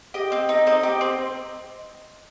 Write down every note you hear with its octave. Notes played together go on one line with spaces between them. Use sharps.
G4 D#5
C4
D#4
C4 D#5
G4
C4